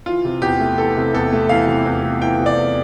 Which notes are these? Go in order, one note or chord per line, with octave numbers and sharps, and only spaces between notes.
E3 F4
C3
E2 G4
A3
E3 A4
C3
E2 A4
A3
E3 F5
C3
E2
A3
E3 G5
C3
D5
E2